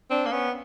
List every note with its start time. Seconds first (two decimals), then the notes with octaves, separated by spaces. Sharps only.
0.10 C4 D4
0.26 A#3
0.32 B3 C#4